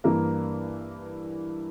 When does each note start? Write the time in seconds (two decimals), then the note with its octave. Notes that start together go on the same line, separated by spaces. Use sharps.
0.04 G2 E3 A#3 A#4